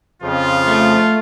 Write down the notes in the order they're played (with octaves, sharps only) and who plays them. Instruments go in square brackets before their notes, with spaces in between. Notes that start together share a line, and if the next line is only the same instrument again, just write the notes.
[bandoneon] F2 C#3 F3 [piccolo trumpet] F4
[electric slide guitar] A3